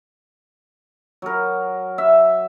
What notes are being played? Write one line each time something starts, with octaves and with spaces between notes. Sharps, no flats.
F#3 A#4
E5